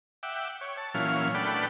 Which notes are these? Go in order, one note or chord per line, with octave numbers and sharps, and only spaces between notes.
E5 F#5 G5 D6
C#5
A5
A#2 E3 F#3 C#4 F5 F6
A3 D4 B4 D5 F#5 G5